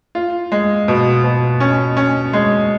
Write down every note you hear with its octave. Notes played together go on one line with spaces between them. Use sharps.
F4
G#3
B2
B2
C#4
C#4
G#3